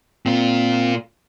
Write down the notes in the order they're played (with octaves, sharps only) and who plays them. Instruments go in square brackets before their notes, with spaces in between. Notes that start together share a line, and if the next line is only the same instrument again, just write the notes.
[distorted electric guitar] A#2 F4 [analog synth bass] C4